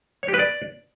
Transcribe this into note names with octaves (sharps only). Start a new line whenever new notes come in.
C#5
G4
B4
D5